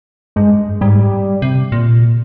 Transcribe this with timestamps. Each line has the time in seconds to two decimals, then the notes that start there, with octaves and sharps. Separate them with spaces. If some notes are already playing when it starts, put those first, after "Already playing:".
0.36 G2 G#3
0.81 G#2 G3
1.42 C3
1.72 A#2